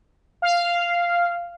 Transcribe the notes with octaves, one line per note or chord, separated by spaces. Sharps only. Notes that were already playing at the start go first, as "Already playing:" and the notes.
F5